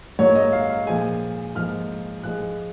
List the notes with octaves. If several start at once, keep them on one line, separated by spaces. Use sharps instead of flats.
G#2 F#3 A#3 C#5
D#5
F5
F5
A#2 F3 G#3 G#5
G#2 F3 A#3 F6
G#2 F3 G#3 F#6